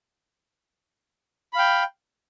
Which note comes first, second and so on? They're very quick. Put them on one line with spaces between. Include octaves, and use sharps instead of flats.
B5 F5 G5